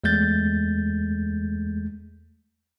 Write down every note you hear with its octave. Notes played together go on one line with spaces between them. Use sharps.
E2 G#3 A3 G6 A6